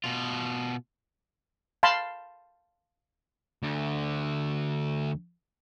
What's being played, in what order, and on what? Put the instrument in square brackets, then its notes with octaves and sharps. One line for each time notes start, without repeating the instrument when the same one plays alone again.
[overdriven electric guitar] B2 F4
[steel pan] F5 A5 B5 C6
[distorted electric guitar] D2 D3